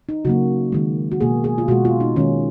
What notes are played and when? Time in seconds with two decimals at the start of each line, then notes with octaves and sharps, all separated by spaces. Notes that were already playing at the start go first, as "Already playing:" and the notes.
0.09 D#4
0.25 C#3 F#3 A#3 F#4
0.72 D#3 G#3
1.12 F#4
1.21 B2 A#3 G#4
1.44 G#4
1.58 F4
1.68 B2 G#3 F#4
1.85 F4
2.00 D#4
2.16 D#3 C#4
2.20 G#3